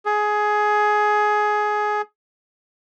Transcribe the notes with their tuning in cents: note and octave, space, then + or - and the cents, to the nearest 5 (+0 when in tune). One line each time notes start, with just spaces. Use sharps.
G#4 +15